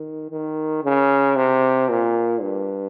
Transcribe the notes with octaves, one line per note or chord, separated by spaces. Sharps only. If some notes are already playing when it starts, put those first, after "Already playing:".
Already playing: D#3
D#3
C#3
C3
A#2
G2